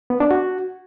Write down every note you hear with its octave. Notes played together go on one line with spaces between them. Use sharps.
B3
D4
F#4